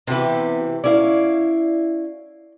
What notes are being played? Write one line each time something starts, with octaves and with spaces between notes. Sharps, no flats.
C3 E3 B3 G4
C#4 E4 D5 F5